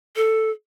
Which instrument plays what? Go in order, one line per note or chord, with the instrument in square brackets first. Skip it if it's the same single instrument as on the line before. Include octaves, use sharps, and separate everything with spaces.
[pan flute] A4